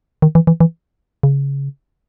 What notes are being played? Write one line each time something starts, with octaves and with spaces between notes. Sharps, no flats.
D#3
E3
E3
E3
C#3